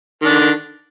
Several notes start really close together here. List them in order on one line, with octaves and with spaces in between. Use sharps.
D#3 D4 D3